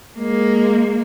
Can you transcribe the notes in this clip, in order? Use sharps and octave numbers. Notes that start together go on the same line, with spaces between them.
G#3 A#3